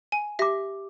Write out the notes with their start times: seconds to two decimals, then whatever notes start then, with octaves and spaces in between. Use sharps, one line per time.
0.12 G#5
0.39 G4 E5 D6 A#6